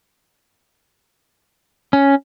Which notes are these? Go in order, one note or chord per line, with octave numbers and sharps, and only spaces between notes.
C#4